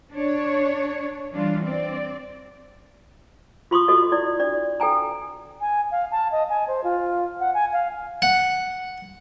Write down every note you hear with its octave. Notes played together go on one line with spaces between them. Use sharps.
D4 C#5
E3 G3 D4 F4
C4 D5
F4 C6 C#6 D#6
F#4 A4 D#5
E4 D5
D4 D5
A4 G5 G#5 A#5
G#5
F5
A5
D#5
G#5
C5
F4
F#5
G#5
F5
F#5